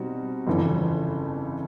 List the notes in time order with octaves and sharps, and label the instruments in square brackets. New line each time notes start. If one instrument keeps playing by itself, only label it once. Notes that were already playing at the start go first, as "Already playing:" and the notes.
Already playing: [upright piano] B2 G3 C4 D#4 F#4
G1 F2 C#3 E3